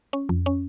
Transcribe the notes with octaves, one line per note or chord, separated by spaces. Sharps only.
C#4
F2
C#4